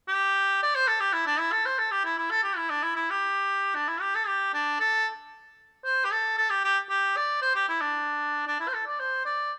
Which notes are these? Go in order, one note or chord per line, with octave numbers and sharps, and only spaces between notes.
G4
D5
C5
A4
G4
E4
D4
E4
A4
C5
A4
G4
E4
E4
A4
G4
E4
D4
E4
E4
G4
D4
E4
G4
A4
G4
D4
A4
C5
G4
A4
A4
G4
G4
G4
D5
C5
G4
E4
D4
D4
E4
C5
A4
D5
C5
D5